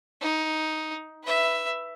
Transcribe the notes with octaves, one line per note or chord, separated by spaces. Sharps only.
D#4
B4 E5